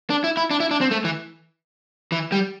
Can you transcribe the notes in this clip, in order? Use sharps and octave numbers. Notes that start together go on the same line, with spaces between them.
D4
E4
E4
D4
E4
D4
C4
A3
E3
E3
G3